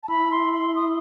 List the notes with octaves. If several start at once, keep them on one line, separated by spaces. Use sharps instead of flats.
A5
E4 B5
C6
C6
D#6